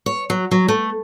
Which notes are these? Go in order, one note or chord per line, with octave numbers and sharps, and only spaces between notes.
C#5
F#3
F#3
A3